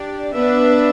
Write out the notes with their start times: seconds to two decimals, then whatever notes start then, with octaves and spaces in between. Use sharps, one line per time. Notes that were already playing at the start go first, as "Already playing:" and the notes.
Already playing: D4 G4 D5
0.33 B3 D4 B4 E5